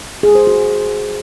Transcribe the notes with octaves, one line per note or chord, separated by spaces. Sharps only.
G#4
C5
F#4